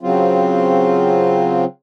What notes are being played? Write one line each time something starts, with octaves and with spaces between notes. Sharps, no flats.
C#3 F#3 C4 F4